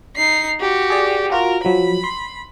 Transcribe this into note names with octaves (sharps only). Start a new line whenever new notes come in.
D#4 C7
F#4 G4
G#4 D5
F4 F#4 A#4
F3 F#3 B5
C6